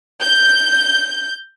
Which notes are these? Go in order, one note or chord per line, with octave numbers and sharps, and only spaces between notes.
G6